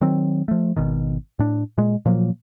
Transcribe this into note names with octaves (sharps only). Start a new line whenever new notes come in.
D#3 F#3 C4
F3 A3
G#1 B2 D#3
A2 D4
A#2 G#3
A#2 F3 F#3 A#3